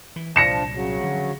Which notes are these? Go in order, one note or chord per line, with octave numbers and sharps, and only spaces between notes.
E3
C2 A#2 F3 D4 A#6 C#7 E7
C#3 F#3
D3 F3 G3